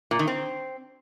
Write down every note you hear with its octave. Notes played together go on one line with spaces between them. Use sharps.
A#2
D#3
C4